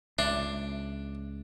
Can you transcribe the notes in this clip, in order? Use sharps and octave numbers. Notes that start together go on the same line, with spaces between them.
C#2 D4 E5